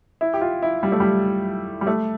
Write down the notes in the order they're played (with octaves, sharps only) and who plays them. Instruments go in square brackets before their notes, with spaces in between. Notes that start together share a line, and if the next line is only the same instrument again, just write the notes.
[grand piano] E4
G4
F4
E4
G3
A3
G3
G3
A3